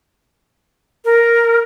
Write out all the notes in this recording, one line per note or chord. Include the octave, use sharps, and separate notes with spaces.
A#4